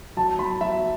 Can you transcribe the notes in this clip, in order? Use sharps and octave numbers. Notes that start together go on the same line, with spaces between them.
F#3 A5
F#3 B5
F#3 E5